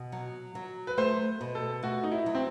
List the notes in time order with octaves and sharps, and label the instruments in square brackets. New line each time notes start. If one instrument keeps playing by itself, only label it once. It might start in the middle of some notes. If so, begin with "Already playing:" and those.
Already playing: [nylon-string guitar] B2
F#3
F#3
[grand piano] B4
[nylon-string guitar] A3 [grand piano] C5
[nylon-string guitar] B2
[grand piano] A4
[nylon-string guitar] A3 [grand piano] F#4
[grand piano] D#4
E4
[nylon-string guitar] F#3
[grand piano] C4